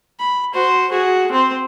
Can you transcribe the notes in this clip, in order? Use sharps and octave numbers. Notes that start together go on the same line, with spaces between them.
B5
F#4 C5
F#4 G#4
C4 C5